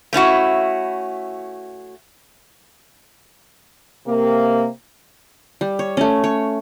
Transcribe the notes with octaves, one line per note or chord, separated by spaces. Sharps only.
A3 C#4 E4 F#4
C3 A#3
G3
C#5
A3 C#4
C#5